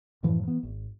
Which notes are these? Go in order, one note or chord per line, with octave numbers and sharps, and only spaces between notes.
F#2 A2 E3 F3
E3 B3
G#1